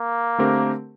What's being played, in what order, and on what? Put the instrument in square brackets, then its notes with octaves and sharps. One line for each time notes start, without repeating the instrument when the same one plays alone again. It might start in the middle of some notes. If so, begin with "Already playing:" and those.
Already playing: [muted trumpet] A#3
[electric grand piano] D3 A3 C4 G4 A#4